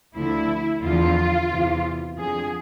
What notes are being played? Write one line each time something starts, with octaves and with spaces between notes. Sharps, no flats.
D2 D3 F3 E4
E2 D3 F3 F4
E2 C3 E3
F2 D3 F3 G#4